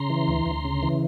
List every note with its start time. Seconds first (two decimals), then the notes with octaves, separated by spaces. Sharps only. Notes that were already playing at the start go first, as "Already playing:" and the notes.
Already playing: C#3 A#5 C6
0.10 E3
0.28 D2
0.46 D2
0.65 C#3
0.83 E3